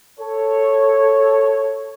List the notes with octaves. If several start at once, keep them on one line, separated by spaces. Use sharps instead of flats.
A4 C#5